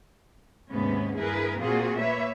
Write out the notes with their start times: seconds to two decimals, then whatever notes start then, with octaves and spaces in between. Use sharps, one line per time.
0.70 D#2 G#2 C3 G#3 B3 C#4
1.17 G2 E4 G#4 A#4 B4
1.58 A#2 C4 F4 F#4 G#4
1.99 A#3 B4 C#5 E5